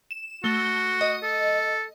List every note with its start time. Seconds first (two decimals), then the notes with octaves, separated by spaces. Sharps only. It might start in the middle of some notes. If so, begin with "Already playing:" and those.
0.11 E7
0.44 A3 F#4 G7
1.01 D#5
1.23 A4